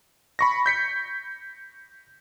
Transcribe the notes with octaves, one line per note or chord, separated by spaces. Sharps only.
B5 C#6 A#6
G6 B6 C#7